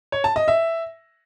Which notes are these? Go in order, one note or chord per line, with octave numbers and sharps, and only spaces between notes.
C#5
A5
D#5
E5